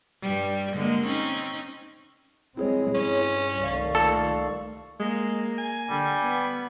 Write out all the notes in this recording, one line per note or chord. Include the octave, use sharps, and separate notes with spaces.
G2 G3
D3 G#3 A#3
C4 C#4 D#4
G#3 C4 E4 G#4 C#5
G2 C#4
C2 D#3 A3 D5 F5 C#6
A#2 A4
G#3 A#3
G#5
D3 G3
B3